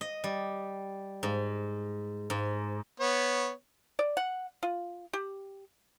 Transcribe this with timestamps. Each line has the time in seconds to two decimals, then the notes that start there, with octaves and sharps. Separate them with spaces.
0.01 D#5
0.24 G3
1.23 G#2
2.30 G#2
3.00 B3 C#5
3.99 D5
4.17 F#5
4.63 F4
5.13 G4